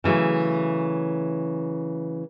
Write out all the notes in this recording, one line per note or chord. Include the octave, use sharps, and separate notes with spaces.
C#3 E3 F#3 A3